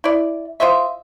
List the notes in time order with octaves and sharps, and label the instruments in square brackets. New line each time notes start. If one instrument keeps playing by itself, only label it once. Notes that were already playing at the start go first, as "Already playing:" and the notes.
[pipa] E4 D5
F4 C5 D#5 E5